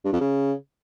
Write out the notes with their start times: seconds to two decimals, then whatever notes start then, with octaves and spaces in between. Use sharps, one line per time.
0.04 G2
0.13 F2
0.21 C#3